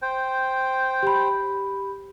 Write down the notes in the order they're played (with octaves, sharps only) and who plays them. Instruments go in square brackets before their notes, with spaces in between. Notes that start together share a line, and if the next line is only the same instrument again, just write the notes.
[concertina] C5 G5
[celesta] G4 B5